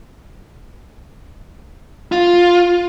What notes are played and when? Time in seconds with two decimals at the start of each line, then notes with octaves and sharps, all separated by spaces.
2.12 F4